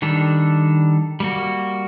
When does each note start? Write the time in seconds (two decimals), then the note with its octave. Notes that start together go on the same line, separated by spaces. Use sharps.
0.02 D#3 G3 D4 A4
1.20 G3 A#3 F#4